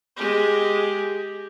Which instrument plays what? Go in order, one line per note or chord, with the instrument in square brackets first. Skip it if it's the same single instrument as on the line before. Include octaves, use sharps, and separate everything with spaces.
[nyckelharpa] G#3 G4